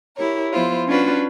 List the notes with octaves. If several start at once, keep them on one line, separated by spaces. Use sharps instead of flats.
E4 G4 A#4 C#5
F3 B3 E4 F4 C5
C#4 D4 F4 F#4 B4